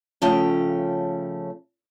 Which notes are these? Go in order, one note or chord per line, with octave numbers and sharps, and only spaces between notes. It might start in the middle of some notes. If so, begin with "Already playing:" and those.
C#3 F3 A3 C#4 G5